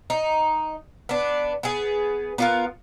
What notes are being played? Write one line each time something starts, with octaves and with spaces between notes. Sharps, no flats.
D#4
B3 D4
B3 G#4
B3 F4 A#4